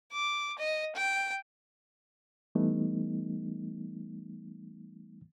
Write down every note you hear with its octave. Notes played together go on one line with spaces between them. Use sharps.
D6
D#5
G5
E3 G3 A3 B3 D#4